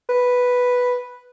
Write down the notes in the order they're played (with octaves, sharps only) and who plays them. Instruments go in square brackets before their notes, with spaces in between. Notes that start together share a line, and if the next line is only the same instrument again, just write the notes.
[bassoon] B4